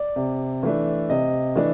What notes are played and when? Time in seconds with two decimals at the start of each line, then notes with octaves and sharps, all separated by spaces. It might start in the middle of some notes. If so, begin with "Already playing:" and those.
Already playing: D5
0.16 C3
0.63 E3 A3 D4
1.10 C3 D#5
1.56 E3 A3 D4